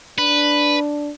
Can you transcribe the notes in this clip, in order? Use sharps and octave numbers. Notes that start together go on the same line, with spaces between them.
D4 B4